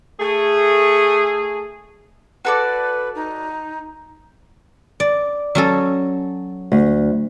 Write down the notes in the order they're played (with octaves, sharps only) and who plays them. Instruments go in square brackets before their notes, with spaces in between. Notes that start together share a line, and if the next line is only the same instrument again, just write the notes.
[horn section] A3 G#4
[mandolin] F#4 A4 D5 [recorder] B4
[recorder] D#4
[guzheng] D5
F#3 C#4 A4
[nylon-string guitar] D2